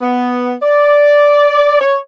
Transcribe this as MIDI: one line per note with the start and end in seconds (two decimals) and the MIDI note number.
0.02 0.52 59
0.63 1.80 74
1.81 1.96 73